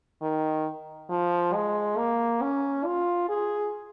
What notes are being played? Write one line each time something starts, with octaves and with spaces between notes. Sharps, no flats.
D#3
F3
G#3
A#3
C#4
F4
G#4